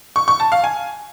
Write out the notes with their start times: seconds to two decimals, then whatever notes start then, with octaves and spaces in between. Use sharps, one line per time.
0.16 C#6
0.28 C#6
0.40 A5
0.52 F5
0.64 G#5